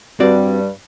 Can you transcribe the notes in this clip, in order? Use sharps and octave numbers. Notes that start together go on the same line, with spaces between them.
G2 G3 C4 F#4 D5